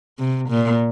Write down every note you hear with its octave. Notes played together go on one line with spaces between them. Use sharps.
C3
A#2